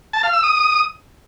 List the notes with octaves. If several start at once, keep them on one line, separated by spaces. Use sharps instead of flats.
A5
F5
E6
D#6